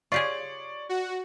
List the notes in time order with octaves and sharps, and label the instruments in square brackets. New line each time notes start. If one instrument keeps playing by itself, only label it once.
[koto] F4 G4 G#4 [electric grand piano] C#5 D5 C#6
[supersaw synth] F#4